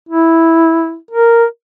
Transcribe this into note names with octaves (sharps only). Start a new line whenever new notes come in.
E4
A#4